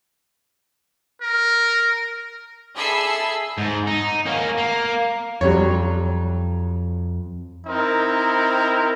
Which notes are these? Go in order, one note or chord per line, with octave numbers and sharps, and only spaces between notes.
A#4
G#4 A4 E5 B5 E6 C7
G#2
D#4
A#3 C#4
A#3
F2 F#3 G3 C#5
C4 D#4 E4 A#4